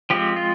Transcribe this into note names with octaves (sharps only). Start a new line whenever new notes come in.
F3 G#3 C4 G4
F4